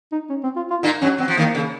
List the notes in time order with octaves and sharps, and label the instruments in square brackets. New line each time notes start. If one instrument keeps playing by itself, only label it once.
[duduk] D#4
C#4
C4
F4
F4
[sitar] A#2 A#3 [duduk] D#4
[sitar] F#2 F#3 [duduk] C#4
[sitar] F#3 [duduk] C4
[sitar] F3
[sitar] D#2 D#3 [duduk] A#3
[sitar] C#3